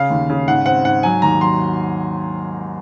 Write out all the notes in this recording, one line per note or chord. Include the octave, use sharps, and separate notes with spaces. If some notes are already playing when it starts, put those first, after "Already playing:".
Already playing: C#3 F5
D#2
C#3
G#2 F#5
C4 F#5
G#2 F#5
F#3 G#5
D#2 A#5
F#3 C6